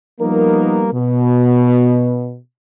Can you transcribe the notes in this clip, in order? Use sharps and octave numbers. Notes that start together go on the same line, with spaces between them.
F3 G3 A#3 B3 D#4 A#4
B2